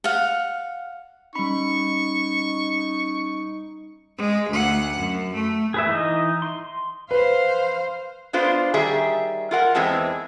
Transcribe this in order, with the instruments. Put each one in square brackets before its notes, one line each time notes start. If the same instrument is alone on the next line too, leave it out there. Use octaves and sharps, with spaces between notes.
[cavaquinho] F5 F#5
[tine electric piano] G3 B5 [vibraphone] C#4 [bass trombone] D#4 [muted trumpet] C#6
[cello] G#3
D2 F#5
F#2
A3
[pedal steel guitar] G#4 B4 E5
E3 D#4 D#5
C6
[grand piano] B4 [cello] C5 F5
[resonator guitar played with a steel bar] B3 D4 F4 C5
D#3 G3 G#4 E5
F4 A#4 F#5
E2 E3 G#3 C4 A5